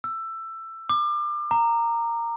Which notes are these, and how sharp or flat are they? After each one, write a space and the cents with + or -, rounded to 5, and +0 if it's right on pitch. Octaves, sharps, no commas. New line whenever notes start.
E6 +15
D6 +30
A#5 -10